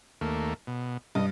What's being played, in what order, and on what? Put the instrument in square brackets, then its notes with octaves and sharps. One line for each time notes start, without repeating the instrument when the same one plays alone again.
[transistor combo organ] D#2 A3 A#3
B2
[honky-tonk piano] G2 [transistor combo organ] D#5